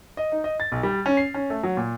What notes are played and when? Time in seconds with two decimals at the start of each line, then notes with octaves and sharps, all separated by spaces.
0.17 D#5
0.32 D#4
0.44 D#5
0.60 A6
0.72 B1
0.83 G3
1.06 C#4
1.17 C7
1.34 C#4
1.50 A3
1.63 F#3
1.77 A#2